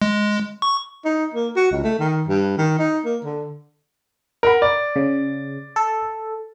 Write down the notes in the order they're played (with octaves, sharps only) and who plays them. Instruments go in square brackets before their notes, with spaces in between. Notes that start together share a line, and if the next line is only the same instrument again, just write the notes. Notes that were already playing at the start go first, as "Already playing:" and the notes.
[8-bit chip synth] G#3
C#6
[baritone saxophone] D#4
A#3
F#4
C#2
A3
D#3
G2
D#3
D#4
A#3
D3
[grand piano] A#4 F#5 B5
D5
[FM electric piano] C#3
A4